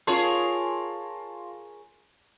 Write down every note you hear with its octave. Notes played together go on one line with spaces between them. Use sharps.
F4 G#4 A#4 C#5 A5 C6